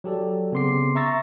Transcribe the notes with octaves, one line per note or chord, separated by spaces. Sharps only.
F#3 G4 A4 D5
C#3 B3 C4 C6 D6 C7
E5 A#5 C#6 E6 A6 A#6